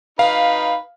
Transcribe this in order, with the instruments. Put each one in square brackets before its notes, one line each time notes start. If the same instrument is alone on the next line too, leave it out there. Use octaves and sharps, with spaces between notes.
[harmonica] D#4 B4 [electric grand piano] F5